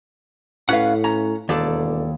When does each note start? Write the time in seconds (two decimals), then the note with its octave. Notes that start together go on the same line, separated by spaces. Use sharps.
0.69 A2 C#4 B4 F5 F#5
1.04 C#4 A#5
1.49 E1 D#2 A4 D5